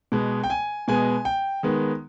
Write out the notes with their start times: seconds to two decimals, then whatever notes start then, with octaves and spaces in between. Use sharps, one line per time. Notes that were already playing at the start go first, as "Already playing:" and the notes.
0.12 B2 G#3 B3
0.44 G5
0.50 G#5
0.88 B2 G#3 B3 G#5
1.25 G5
1.63 D#3 G#3 B3